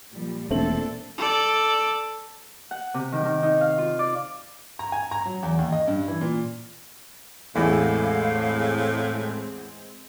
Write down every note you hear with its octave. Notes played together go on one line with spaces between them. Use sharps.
A#2 F3 G3
E1 A#2 A3 C4 D4 A4 F#7
A4 D5
F#5
C3
D#3
D#3
D#4
F5
F4
D5
A#5
G#5
A#5
F#3
E2
D#2
D#5
G2
E3
A#2
A1 E2 A2 E3 G#3 C4 F5